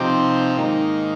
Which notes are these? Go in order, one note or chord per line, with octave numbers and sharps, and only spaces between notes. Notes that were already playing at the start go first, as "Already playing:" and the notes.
Already playing: C3 F3 C4 D#4 G4
G#2 D#3 A#3 D#4